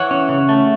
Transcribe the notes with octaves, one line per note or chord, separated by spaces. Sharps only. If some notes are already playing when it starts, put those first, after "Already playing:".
Already playing: E3 C#5 F#5
C#4
C#3
A3